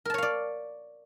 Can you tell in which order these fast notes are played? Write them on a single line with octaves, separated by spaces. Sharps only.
A#4 A5 C#5 F5 D5